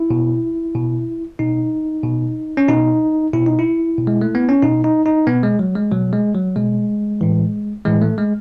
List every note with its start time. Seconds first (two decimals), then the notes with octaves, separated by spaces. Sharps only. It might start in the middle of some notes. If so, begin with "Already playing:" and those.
Already playing: E4
0.10 B2
0.75 B2
1.39 B2 D#4
2.04 B2
2.57 C#4
2.68 B2 D#4
3.33 B2 E4
3.46 D#4
3.59 E4
3.98 B2
4.07 G#3
4.21 A3
4.35 B3
4.49 C#4
4.62 B2 D#4
4.84 D#4
5.06 D#4
5.27 B2 B3
5.43 G#3
5.59 F#3
5.76 G#3
5.92 B2 F#3
6.13 G#3
6.35 F#3
6.56 B2 G#3
7.21 A2 E3
7.85 A2 E3 G#3
8.02 A3
8.18 G#3